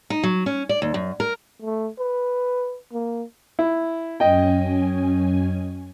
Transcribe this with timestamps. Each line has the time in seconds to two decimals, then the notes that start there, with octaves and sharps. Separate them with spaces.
0.10 D#4
0.23 F#3
0.46 C#4
0.69 D5
0.82 D#2
0.94 F#2
1.20 A#4
1.63 A3
1.99 B4
2.93 A#3
3.59 E4
4.20 F#2 C#4 D#5 G5 G#5